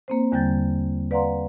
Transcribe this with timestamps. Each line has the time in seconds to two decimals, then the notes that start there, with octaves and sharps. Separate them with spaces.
0.08 A#3 C4 C5
0.32 E2 D3 G3 G5 G6 A6
1.11 B4 D5 F5 F#5 A#5 C6